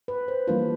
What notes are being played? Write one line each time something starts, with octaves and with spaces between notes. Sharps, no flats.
B4
C5
E3 G3 A#3 D4 F4 B4